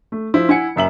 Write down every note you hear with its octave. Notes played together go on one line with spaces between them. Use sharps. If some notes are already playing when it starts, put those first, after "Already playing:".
A3
F3 E4 C5
E4 F#5 G#5 C#7
F#1 F#2 E5 F#7